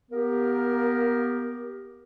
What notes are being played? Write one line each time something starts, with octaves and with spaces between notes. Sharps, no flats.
A#3 B3 G4 A#4